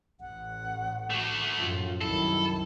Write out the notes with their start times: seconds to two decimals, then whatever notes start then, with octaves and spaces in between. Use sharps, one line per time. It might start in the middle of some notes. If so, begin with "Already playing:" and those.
0.21 A1 F#5
1.10 A3 F#4
1.58 F#2 A2 F3 F4
2.01 C2 F#2 D#3 E4 A4